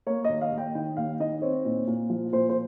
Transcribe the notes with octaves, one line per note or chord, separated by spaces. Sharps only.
A#3 C#5
D#5
D#2
F5
D#2
G5
D#3 G5
D#2 F5
D#3 D#5
C4 C#5
A#2
A#2
F3
A#2 C5
C5